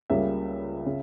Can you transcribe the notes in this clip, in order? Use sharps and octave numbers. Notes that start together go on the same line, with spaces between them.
C#2 C#3 G3 A#3 C#4 E5
C#3